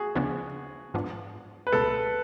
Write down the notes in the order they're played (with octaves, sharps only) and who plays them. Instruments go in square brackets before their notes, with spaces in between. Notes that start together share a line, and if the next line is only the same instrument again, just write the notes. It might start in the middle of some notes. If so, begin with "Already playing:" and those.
Already playing: [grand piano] F#4 G#4
[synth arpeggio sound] D2 C#3 F3 B3 D4
G#2 F3 B3 D4
[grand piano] B4
[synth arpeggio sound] C#2 B2 G#3 [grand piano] A4